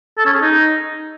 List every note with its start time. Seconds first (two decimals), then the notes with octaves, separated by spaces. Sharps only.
0.18 A4
0.26 C#4
0.33 G#4
0.41 D#4